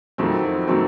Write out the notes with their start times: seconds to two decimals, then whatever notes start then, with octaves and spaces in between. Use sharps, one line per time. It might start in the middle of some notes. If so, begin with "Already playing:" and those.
0.18 F2 D#3 F#3 A3 C4
0.67 D#3 F#3 A3 C4